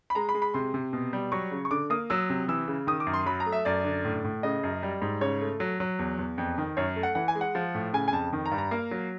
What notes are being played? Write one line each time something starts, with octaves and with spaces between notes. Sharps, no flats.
B5
G#3 A#5
B5
G#3
B5
C3 C6
C3
B2
G3
F#3 C#6
C#3
C#6
D3 D6
A#3 D#6
F#3 E6
C3
E3 E6
C#3
D#3 D#6
D6
F#2
C6
F#3 B5
A#5
A3
E5
F#2 D5
D3
A2
A2
C#3 D#5
F#2
G3
G#2
C#3 C#5
A3
F#3
F#3
E2
E2
F2
D#3
F#2 C#5
A3
F#5
E3 F#5
G#5
G#3
F#5
F3
A2
C#3 G#5
G#5
F2 A5
D#3
A#5
G2
A#5
A#3
F#3